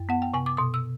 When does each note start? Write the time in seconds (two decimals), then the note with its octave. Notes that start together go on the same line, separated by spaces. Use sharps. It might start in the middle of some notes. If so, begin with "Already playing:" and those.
Already playing: F#2
0.09 B3 F#5
0.22 G5
0.34 C3 G#5
0.46 D6
0.57 B2 D#6
0.74 E6